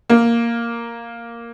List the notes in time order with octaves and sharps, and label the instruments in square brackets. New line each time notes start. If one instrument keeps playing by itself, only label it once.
[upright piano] A#3